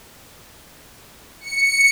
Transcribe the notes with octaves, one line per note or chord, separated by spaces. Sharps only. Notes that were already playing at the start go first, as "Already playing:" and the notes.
C#7